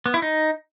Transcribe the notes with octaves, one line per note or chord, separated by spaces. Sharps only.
B3
E4
D#4